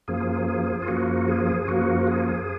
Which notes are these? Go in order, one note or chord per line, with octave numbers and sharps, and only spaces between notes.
F#2 F3 A#3 G#4
G#4
F4
F#2 F3 A#3 F#4
G#4
F#2 F3 A#3 F#4
G#4